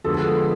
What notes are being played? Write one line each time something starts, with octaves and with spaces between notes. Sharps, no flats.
D3 F3 G#3 B3 A4